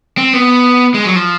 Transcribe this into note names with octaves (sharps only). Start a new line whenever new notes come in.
C4
B3
G#3
F#3
F3